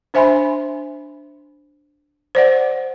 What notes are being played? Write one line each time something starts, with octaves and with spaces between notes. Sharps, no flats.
D4 C5 E5 G#5 B5 C6
C5 D5 F#5